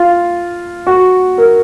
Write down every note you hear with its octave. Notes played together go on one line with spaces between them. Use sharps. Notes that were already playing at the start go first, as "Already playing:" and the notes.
Already playing: F4
F#4
A#4